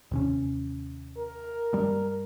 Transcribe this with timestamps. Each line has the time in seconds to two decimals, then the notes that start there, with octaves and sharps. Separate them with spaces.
0.11 D#2 C3 C#4
1.18 A#4
1.73 G2 G3